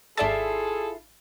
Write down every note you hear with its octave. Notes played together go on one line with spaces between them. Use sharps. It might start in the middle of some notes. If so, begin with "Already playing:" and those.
G#1 E4 F4 G#4 A4 D5 E5 A5